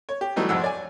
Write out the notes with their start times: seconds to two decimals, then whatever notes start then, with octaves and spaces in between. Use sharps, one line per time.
0.09 C#5
0.21 G4
0.36 E3 F#3 G3 A3 B3 D#4
0.49 C2 F2 G#2 F#5 E6
0.62 C#5 D5 G#5